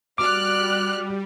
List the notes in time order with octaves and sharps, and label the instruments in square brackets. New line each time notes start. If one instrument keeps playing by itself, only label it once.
[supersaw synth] G3 [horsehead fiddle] F#4 D5 [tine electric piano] D6 [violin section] F6 F#6